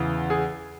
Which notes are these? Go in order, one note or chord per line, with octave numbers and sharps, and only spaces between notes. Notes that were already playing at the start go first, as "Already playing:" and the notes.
Already playing: E2 C#3 E3
G#4